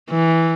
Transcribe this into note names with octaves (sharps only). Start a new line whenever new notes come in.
E3